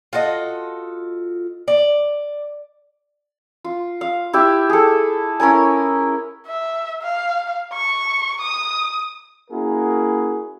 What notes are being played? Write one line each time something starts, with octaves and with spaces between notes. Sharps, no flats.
F4 F#4 A4 D#5
D5
F4
F5
E4 G4 E5
G#4 A4
C#4 E4 A#4 G#5
E5
F5
C#6
D#6
A#3 C#4 E4 F#4 G#4 A#4